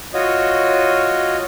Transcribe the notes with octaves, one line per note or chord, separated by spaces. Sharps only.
F4 F#4 C#5 D#5